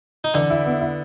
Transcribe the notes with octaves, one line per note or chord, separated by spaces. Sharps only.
D#4
D3 E3 D4
E4
B3
E4